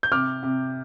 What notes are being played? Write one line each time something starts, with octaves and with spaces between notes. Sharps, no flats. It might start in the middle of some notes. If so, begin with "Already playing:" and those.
G6
C3 D6 F6
C3